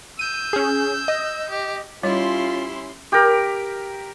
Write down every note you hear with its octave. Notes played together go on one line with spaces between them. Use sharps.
E6 G6 D#7
C#4 G#4
D#5
G4
G3 C#4 E4 F4 G4 C#5 D#5 C6
G4 A#4